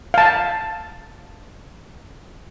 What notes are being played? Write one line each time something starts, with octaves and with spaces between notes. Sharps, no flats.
F5 A5